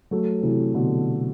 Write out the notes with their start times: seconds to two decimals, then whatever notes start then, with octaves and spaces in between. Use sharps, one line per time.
0.11 F#3 A3
0.43 C3 E3
0.74 B2 D3